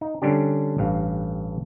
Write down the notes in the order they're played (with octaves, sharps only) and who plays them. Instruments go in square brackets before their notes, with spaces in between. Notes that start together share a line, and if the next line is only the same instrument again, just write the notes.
[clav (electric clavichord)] D#4
D3 G3 C#4 D4 G4
A1 G2 F5